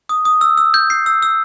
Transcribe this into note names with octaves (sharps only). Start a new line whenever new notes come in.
D#6
D#6
E6
E6
G6
C7
E6
E6